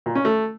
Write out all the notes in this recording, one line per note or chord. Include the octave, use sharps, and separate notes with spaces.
A#2
C#4
A3